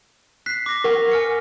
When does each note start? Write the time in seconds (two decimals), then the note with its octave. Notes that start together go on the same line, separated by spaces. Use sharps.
0.46 F#6 B6 C7
0.66 D6 A#6
0.84 A#4 F#5 C#6
1.12 G#5 F6 C#7